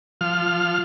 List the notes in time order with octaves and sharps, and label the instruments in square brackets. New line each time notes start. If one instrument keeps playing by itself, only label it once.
[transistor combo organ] F3 F6